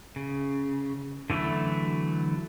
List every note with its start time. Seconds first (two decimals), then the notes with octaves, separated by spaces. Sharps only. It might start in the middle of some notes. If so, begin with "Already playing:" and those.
0.16 C#3
1.30 D3 E3 F#3 A3 E4